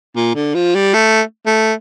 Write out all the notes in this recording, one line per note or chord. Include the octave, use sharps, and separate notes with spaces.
A#2
D3
F3
G3
A3
A3